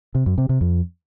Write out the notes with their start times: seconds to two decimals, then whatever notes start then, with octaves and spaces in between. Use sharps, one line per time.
0.15 C3
0.26 F#2
0.38 C3
0.49 C3
0.61 F2